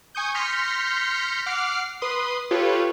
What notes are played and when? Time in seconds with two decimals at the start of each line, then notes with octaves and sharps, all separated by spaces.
0.15 G#5 C#6 D#6 G6
0.34 C6 F6 G6 A#6 B6 C#7
1.46 F#5 D6 F6 C7
2.01 B4 C6 D#6
2.51 F4 G4 A4 B4 C#5